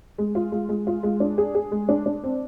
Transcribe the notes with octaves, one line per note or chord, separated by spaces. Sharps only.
G#3
F4
G#3
G#3
F4
G#3
D4
G#4
G#4
G#3
D4
D4
C4